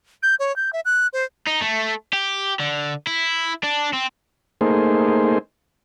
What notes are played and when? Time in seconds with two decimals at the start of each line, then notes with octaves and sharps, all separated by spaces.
0.23 G6
0.39 C#5
0.56 G6
0.73 E5
0.85 F#6
1.13 C5
1.47 D#4
1.62 A3
2.13 G4
2.59 D3
3.07 E4
3.63 D4
3.93 C4
4.61 A3 A#3 D#4 G#4 C5